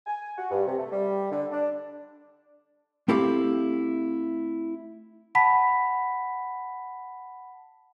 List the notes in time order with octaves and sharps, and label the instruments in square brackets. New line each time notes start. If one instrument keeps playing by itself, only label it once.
[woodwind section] G#5
F#4
G2
C3
A3
G3
D3
D4
[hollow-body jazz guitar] A3 C4 E4 G4 A4 F5
[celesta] F#5 A5 B5 B6